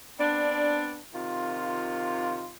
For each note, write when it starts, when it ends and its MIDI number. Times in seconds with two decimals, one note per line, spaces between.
0.19 0.98 59
0.19 0.98 60
0.19 0.98 62
1.14 2.51 48
1.14 2.51 51
1.14 2.51 65